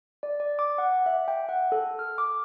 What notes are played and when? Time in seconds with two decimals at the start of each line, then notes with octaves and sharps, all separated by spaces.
0.23 D5
0.40 D5
0.59 D6
0.78 F#5
1.06 E5
1.28 G5
1.49 F#5
1.72 A4
1.99 F6
2.18 D6